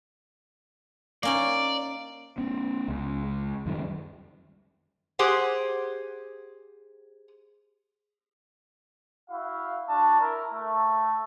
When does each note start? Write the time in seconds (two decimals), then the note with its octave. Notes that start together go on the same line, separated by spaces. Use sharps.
1.23 A#3 C#4 D#4 D5
2.38 B3 C#4
2.88 C#2
3.66 F#2 D#3 G3
5.19 G4 G#4 C5 F#5
9.30 E4 F#4 F5
9.88 D4 F#4 A5
10.19 E4 A#4
10.54 A3